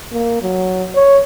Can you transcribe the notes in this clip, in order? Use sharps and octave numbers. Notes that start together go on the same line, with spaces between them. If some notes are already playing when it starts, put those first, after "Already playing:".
A#3
F#3
C#5